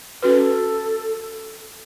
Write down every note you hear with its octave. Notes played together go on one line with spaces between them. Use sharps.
C#4 F#4 A4 B4